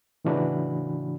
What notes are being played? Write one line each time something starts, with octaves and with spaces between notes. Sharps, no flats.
A2 C#3 E3 D4 F#4 B5